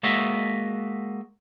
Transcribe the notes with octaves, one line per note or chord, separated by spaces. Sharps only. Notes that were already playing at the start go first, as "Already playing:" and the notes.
G#3 A#3 F#4 D#5 E5